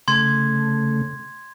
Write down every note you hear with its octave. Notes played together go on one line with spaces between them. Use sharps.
C#3 A3 C6 G#6